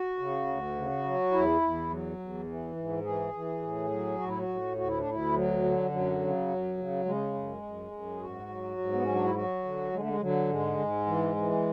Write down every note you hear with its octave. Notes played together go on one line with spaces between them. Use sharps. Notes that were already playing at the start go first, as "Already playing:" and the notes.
Already playing: F#4
C#3
D2
C#3
F#3
E2 E4
E2
F#3
E2
E3
G#2
E3 G#4
E3
A2
F#3
A2 F#4
E4
F#4
A2
D2 F#4
E4
D4
D2 E4
F#3
D3
F#2 F#3
C#3
F#2
C#3
C#3 G#3
F#2
F#2
F#2
G#4
G#2 F#4
F#3
G#2
B3
F#3 C#4
D4
E4
F#3 F#4
D3
D3 G#3
A3
G#3
D3 F#3
G#2 G#3
G#2
E3
E3